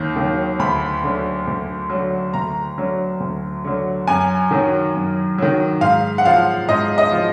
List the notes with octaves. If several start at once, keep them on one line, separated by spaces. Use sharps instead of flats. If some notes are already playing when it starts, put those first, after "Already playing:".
Already playing: D#2 D#3
D#3 F#3
D2 B5
D3 F#3
D2
D3 F#3
D2 A#5
D3 F#3
D2
D3 F#3
F#2 G#5
D#3 F#3
F#2
D#3 F#3
G#2 F5
F#5
F3 F5
G#2 D#5
D#5
F3